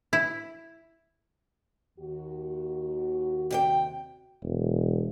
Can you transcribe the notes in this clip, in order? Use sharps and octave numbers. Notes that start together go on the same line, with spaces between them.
E4
D#2 F#4
C3 D5 G5
E1